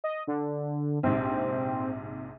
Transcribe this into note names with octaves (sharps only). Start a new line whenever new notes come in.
D#5
D3
A#1 G#2 C3 C4